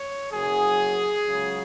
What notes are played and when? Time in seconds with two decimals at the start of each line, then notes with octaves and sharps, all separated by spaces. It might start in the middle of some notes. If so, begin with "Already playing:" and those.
Already playing: C#5
0.33 F#1 F#2 F#3 G#4
1.26 C#2 C#3 F#3